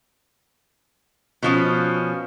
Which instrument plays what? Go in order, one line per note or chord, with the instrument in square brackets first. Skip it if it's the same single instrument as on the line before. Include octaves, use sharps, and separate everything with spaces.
[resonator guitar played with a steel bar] B2 F3 C#4